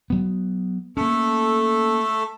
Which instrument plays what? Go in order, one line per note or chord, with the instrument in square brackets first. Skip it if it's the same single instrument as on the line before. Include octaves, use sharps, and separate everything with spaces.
[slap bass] F#3 B3
[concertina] A3 A4 [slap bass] A#3 C#4